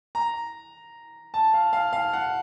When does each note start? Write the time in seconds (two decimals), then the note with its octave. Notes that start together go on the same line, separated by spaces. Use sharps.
0.15 A#5
1.34 A5
1.54 F5
1.73 F5
1.93 F5
2.13 F#5